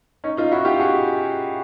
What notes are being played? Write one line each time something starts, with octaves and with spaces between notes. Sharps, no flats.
C#4 D#4
D#4 F4
E4 F#4
F4 G4
F#4 G#4